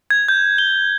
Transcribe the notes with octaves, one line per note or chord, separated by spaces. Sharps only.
G#6
G6
G7